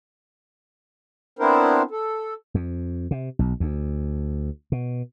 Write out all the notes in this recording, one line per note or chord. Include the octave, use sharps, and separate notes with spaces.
B3 C4 D4 E4 A#4 C5
A4
F2
C3
B1
D2
B2